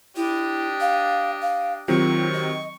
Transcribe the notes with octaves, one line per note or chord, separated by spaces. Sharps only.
D4 E4 G4 D#5
F5
F5
C3 D#3 F#3 F4 C#6
D#5